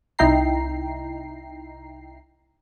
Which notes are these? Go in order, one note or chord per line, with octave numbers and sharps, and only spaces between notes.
C2 D#4 E4 G5 A#5 C7